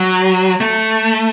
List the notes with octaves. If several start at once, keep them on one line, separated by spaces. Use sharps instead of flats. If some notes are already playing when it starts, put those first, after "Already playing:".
Already playing: F#3
A3